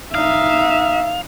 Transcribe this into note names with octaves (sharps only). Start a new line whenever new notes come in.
D#4 E5 F5